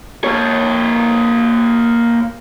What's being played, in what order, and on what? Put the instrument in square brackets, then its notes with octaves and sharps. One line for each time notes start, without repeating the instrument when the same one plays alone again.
[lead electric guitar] A#3 C#5